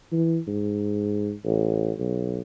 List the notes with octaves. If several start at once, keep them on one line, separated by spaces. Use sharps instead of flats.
E3
G#2
A1
B1